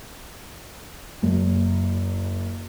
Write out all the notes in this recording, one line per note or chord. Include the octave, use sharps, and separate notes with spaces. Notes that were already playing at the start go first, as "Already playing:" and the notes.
F#1